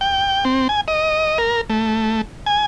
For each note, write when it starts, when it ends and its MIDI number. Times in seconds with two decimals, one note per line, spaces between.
0.01 0.45 79
0.45 0.68 60
0.69 0.81 80
0.88 1.38 75
1.38 1.61 70
1.70 2.21 57
2.46 2.66 80